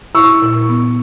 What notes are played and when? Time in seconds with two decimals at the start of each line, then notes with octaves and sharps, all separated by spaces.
0.15 E4 C#6 E6
0.42 A#2
0.69 B3